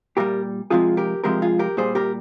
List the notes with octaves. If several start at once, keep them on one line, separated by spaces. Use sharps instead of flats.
A#2 G3 G4 A#4
C3 F3 G#3 F4 G#4
G4 A#4
C3 F3 G#3 G4 A#4
F4 G#4
G4 A#4
A#2 G3 G#4 C5
G4 A#4